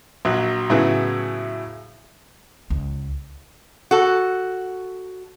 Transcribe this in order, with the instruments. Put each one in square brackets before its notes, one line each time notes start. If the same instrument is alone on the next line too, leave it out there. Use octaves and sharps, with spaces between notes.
[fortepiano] A#1 F#3
A2 C#3 F#3 B3 E4 G#4
[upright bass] C#2
[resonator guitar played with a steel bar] F#4 A4